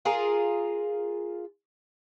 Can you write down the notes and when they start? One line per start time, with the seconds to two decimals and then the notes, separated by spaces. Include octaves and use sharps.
0.05 F4 G#4 A#4